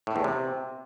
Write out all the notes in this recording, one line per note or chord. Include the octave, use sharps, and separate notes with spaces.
A2
E2
C3